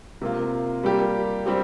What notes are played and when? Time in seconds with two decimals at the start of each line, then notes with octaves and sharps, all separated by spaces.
0.21 C3 A#3 F4
0.83 G3 A#3 G4
1.46 G3 C4 G4